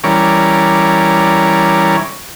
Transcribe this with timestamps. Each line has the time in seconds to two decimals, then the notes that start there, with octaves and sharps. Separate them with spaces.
0.04 E3 G3 C#4 A#4 C#5 D5